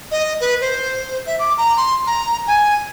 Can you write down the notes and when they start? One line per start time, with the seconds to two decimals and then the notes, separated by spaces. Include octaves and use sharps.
0.11 D#5
0.41 B4
0.61 C5
1.26 E5
1.39 D6
1.57 A#5
1.77 C6
2.07 A#5
2.47 G#5